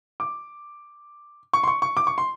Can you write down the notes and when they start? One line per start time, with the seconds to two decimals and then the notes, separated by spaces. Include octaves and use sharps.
0.20 D6
1.53 C#6
1.63 C6
1.67 C#6
1.82 C#6
1.97 D6
2.07 C#6
2.18 C6